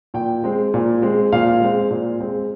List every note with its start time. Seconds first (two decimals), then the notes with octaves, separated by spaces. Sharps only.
0.14 A#2 G5
0.44 G#3 C4
0.74 A#2
1.02 G#3 C4
1.32 A#2 F5
1.61 G#3 C4
1.91 A#2
2.20 G#3 C4